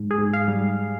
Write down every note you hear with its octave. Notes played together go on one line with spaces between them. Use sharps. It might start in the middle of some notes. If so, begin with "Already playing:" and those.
Already playing: G#2
G#4
G#2
F5
G3